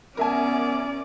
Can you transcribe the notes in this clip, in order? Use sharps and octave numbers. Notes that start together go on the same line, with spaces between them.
B3 C#4 A#4 D5 E5 G#5